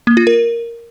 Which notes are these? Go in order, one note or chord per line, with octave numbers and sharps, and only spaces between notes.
A#3
F4
A#4